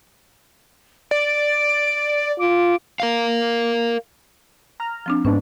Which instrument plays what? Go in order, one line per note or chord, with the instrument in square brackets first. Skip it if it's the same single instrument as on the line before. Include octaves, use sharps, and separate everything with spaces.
[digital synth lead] D5 [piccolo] D7
[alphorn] F4 [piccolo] D6
[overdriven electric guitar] A#4 F5
[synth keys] A#5 F6
[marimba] F3 C4 D4
[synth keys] G#2 B3 D4 [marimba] C#4